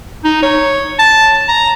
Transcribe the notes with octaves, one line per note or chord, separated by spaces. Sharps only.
D#4
C#5
A5
A#5